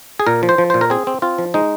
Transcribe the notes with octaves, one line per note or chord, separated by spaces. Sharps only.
G#4
A#2 A#4
F3
C5
F3
A#2 C5
A#4
C4 G#4
C4
C4 F4
F3
G#3 D#4